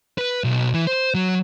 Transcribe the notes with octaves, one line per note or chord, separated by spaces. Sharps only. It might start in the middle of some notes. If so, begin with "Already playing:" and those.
B4
B1
E3
C5
F#3